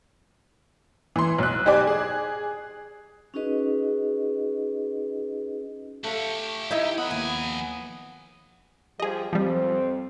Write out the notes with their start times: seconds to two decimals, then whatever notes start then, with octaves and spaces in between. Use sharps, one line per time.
1.16 E3 C6
1.38 B1 F#6
1.66 D#4 G4 C5 D5 G#5 D6
1.87 G#4
3.34 C#4 D#4 F#4 G#4 B4 D#5
6.04 A3 G4 F5 F#5
6.71 D#4 E4 E5 A#5
6.98 F3 B3 F#5 B5
7.11 D#2 F3 G#5
9.00 F3 G3 G4 G#4 D#5
9.33 F2 F3 G3 C4